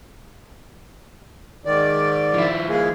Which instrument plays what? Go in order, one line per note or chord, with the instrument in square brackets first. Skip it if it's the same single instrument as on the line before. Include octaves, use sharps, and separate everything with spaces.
[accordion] G#2 D#3 D5
[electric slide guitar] F3 E4
[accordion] G#3 A#3 G#4